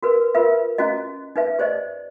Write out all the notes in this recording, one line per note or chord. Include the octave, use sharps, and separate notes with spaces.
F#4 A#4 B4
F4 A#4 B4 E5
C#4 E4 F#4 D#5
D#4 B4 E5
G4 C5 D5 D#5